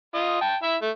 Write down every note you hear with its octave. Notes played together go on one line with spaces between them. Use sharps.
F4 D#5
G5 A5
E4 E5
A3